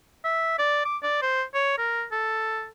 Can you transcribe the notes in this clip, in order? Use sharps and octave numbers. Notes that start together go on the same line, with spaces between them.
E5
D5
D6
D5
C5
C#5
A#4
A4